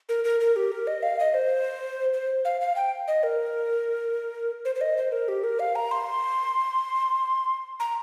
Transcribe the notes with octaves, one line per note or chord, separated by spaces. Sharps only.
A#4
A#4
A#4
G4
A#4
D#5
F5
D#5
C5
C5
F5
F5
G5
D#5
A#4
C5
C5
D#5
C5
A#4
G4
A#4
F5
A#5
C6
A#5